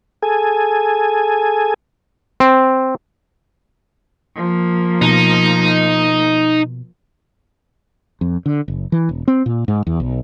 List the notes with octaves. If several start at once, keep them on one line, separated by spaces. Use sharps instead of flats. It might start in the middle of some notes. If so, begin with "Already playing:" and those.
G#4 A4 G#5
C4
F3 A#3
B2 D#4
F2
D3
F#1
E3
E1
C4
A#2
G#2
E2
B1